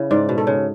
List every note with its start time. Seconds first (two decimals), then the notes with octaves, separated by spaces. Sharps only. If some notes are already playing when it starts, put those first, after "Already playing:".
Already playing: C#3 E4
0.11 G#2 D5
0.29 B2
0.38 A4
0.47 C#3